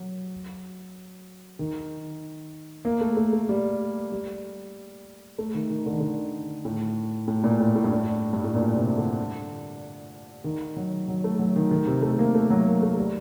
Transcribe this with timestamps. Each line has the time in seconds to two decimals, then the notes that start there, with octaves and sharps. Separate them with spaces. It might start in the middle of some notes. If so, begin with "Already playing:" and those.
Already playing: F#3
1.59 D#3
2.85 A#3
3.01 A3
3.17 A3
3.33 A3
3.49 G3
4.12 G3
5.38 A3
5.54 D#3
5.70 D#3
5.86 D3
5.93 D#3
6.00 D3
6.65 A2
7.28 A2
7.44 A#2
7.60 A2
7.76 A2
7.84 G2
7.91 A2
8.33 G2
8.44 A2
8.55 A#2
8.76 C3
8.98 D3
10.44 D#3
10.76 F#3
11.08 F#3
11.24 A3
11.39 F#3
11.56 D#3
11.71 D#3
11.87 C3
12.02 A3
12.19 A#3
12.35 A3
12.50 F#3
12.66 A#3
12.82 A3
12.97 G3